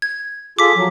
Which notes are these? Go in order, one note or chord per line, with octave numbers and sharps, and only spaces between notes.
G#6
F4 G#4 A4 D6 B6
F3 F#3